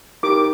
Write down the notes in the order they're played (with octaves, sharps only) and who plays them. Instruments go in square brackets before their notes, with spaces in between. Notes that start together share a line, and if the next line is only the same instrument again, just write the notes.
[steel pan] D#4 G4 A#4 D6